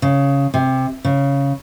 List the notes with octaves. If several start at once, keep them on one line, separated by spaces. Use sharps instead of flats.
C#3
C3
C#3